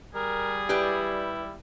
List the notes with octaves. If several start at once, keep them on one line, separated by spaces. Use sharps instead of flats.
G3 G#4 A#4
E4 G4 B4 D5